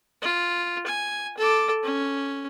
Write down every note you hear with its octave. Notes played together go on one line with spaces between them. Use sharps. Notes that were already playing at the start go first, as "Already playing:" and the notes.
F4
G#5
A4 D6
C#4